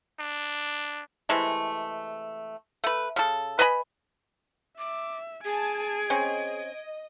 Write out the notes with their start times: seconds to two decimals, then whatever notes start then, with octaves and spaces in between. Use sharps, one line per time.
0.19 D4
1.29 C3 E3 G#3 A3
2.84 A3 B4
3.16 C#3 A4
3.59 B4 D#5 G#5 B5
4.78 E5 D6
5.44 G#4 G#5 A5 G#6 D7
6.10 C4 C#4 D#5